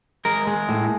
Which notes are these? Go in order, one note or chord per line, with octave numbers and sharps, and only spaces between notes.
G#3 A#4
G#3
A2